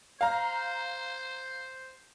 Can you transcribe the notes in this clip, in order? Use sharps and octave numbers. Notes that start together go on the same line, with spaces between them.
C5 F5 A#5